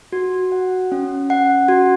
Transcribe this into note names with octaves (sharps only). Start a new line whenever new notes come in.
F#4
F#5
C#4
F#5
F#4